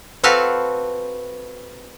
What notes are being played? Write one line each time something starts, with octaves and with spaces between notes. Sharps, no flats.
C4 F#4 A4 B4 F5 A5